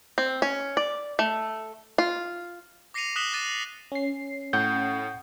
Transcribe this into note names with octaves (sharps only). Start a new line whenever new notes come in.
C4
C#4
D5
A3
F4
D6 A#6 C7 C#7 D#7 F7
D#6 F#6 B6 E7 G7
D6 F#6 A6 D#7 E7
C#4 C7
A2 F#5 G6